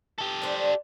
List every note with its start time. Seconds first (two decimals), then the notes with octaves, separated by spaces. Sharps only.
0.18 G4 A4
0.42 D4 C5